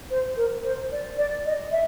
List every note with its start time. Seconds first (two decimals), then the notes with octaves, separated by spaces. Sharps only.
0.10 C5
0.37 A#4
0.64 C5
0.92 D5
1.18 D5
1.46 D#5
1.72 E5